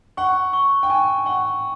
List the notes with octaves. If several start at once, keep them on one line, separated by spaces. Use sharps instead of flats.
F#5 C#6
C#6
G5
G#5 C#6
F#5 C#6